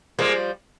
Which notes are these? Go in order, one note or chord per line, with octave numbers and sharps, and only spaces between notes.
F3 G3 G#3 A#3